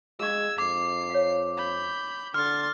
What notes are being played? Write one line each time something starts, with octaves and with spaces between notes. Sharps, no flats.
G#3 G#4 F5 C#6 E6 G#6
F2 D6 C7
C#5 F5
B5 G6
D3 C6 F6 A6